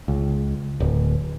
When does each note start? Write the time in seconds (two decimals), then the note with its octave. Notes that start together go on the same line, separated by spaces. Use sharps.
0.08 C#2
0.80 D1